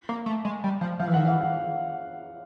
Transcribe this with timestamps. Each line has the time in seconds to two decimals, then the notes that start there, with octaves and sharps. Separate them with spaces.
0.09 A#3
0.26 A3
0.45 G#3
0.64 G3
0.81 F3
0.99 F3 F5
1.07 E3
1.14 D#3 F#5
1.24 E3 F5
1.41 F#5